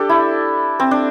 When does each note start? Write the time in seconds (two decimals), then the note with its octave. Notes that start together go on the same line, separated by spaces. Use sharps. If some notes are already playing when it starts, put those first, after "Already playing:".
Already playing: D4 G4 A4
0.09 E4
0.80 C4
0.91 D4